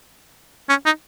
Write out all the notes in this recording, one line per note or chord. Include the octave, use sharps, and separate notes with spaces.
C#4
D#4